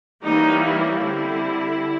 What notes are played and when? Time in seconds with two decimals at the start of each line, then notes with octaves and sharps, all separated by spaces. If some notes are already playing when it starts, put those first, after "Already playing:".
0.22 E3 G3 A#3 C#4 D#4
0.62 E4
1.02 D3 G3 C4